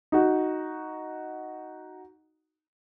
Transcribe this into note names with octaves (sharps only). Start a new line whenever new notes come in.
D#4 F#4